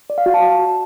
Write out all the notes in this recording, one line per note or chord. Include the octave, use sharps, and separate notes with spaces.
D5
F5
F#4
A5